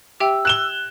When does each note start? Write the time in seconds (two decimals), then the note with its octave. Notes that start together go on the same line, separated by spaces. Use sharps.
0.20 G4 E5 G5 E6
0.45 F#6 E7 G7